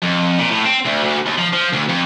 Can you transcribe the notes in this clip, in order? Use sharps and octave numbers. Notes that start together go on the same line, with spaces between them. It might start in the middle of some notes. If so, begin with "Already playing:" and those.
F2
A#2
A2
C4
D2
D2
D#2
F3
F3
D2
F2